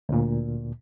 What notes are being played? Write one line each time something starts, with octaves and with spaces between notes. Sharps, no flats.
D2 A#2